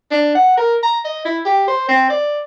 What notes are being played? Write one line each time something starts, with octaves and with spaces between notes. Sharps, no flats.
D4
F#5
A#4
A#5
D#5
E4
G4
C5
C4
D5